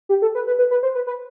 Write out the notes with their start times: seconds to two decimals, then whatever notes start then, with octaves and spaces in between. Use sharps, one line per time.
0.09 G4
0.22 A4
0.35 B4
0.47 B4
0.59 B4
0.71 B4
0.83 C5
0.95 B4
1.07 B4